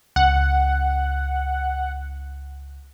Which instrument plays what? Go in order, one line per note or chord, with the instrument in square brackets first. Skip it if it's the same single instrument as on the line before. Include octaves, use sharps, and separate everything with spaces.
[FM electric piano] C#2 [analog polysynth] F#5